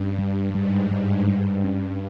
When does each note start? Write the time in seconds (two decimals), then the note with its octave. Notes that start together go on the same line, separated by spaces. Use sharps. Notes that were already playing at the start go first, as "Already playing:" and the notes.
Already playing: G2 C#4
0.19 G3
0.54 G#2 G3
0.91 G3
1.27 G2 G3
1.64 C#4